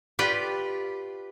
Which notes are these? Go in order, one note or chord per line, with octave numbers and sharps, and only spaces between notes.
F4 G4 B4 D5 G5